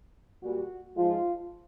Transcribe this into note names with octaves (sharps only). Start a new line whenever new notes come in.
A#2 G3 F#4
G#2 F3 G#3 F4